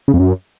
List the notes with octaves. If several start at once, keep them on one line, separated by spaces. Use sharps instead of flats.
C#3
F2
F#2